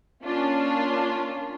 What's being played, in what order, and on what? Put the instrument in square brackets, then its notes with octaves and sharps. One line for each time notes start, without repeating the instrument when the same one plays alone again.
[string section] A#3 C#4 D4 F4